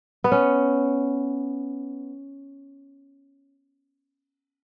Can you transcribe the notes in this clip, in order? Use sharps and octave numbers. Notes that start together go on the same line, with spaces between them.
B3
C#4